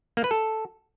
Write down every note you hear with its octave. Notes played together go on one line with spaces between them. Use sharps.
A#3
B4
A4